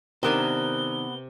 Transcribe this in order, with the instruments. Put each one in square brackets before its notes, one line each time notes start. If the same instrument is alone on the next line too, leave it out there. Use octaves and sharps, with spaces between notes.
[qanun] C3 A#4 G#5 [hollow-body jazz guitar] D#3 D4 [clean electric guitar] B3 [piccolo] G7